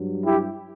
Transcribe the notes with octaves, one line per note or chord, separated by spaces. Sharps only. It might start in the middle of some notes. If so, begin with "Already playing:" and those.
Already playing: G2 F#3
E4 G4